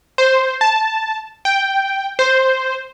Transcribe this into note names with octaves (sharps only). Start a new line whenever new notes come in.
C5
A5
G5
C5